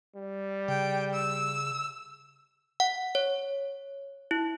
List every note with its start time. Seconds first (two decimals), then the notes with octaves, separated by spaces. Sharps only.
0.15 G3
0.68 C#3 G5
1.13 E6
2.80 F#5
3.15 C#5
4.31 E4